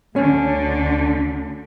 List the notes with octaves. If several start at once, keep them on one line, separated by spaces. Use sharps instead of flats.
D2 D3 C#4